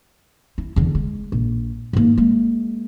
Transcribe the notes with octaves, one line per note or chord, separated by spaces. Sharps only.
E4
E2 D3
G#3
A#1
G#2 A#3
G#3 A#3